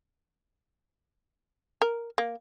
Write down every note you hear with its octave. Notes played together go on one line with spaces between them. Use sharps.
A#4
A#3